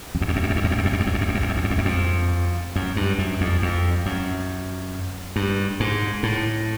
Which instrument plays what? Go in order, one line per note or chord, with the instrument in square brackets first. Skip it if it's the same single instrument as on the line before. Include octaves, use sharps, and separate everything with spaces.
[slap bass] F2
F#2
F2
F#2
F2
F#2
F2
F#2
F2
F#2
F2
F#2
F2
F#2
F2
F#2
F2
F#2
F2
F#2
F2
F#2
F2
F#2
F2
F#2
G2
F#2
F2
F2
F#2
G2
G#2
A2